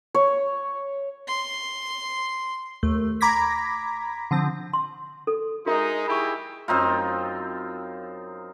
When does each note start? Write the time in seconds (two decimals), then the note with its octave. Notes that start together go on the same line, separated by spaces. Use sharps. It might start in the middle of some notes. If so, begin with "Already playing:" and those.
0.15 C#5
1.27 C6
2.83 D#2 A3
3.21 A#5 B5 D6 G#6 A#6 B6
4.31 D3 F3 C4
4.73 C6
5.27 A4
5.66 G#3 D#4 F#4 A#4 E5
6.08 E4 G4 G#4 B5 C#6
6.68 F#2 C4 D#4 F4